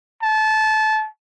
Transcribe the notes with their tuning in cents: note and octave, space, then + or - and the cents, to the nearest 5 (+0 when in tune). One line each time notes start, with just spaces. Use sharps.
A5 -20